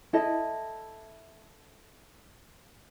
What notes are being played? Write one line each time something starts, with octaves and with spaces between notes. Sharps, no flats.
E4 A4 D#5